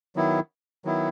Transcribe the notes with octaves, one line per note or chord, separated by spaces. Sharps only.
D#3 F#3 B3 E4
D#3 F#3 B3 E4